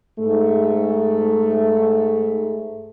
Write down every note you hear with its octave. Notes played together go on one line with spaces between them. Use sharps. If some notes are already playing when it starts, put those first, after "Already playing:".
G#2 A3